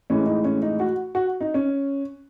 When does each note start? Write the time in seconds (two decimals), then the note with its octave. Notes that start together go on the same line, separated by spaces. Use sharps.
0.10 A2 E3 G#3 C#4
0.26 D#4
0.44 C#4
0.62 D#4
0.80 F#4
1.15 F#4
1.41 D#4
1.54 C#4